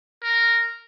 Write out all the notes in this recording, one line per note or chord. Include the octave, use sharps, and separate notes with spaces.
A#4